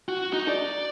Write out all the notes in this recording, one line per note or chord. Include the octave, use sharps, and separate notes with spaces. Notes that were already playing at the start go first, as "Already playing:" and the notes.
F#4
D#4
D5